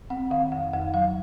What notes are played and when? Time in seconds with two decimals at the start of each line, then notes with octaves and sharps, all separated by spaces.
0.10 C4 F#5
0.30 D#3 F5
0.52 F2 F#5
0.73 F2 F#5
0.94 F#3 F5